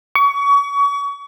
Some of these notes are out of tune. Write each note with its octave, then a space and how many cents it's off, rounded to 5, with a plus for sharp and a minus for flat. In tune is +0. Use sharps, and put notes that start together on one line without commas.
C#6 +30